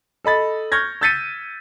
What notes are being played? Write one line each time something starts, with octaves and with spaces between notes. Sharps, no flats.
A4 D#5 B5 A6
C#6 F6 G6 G#6 A#6
E6 G6 A6 B6 C#7 D#7